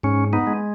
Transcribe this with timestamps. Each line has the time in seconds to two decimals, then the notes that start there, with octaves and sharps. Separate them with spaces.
0.03 G#2 C#4
0.33 B3 D#4
0.47 G#3